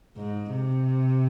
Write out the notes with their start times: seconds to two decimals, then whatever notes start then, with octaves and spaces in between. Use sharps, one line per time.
0.17 G#2
0.53 C3